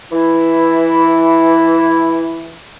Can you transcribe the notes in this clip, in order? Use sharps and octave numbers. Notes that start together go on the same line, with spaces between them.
E3 E4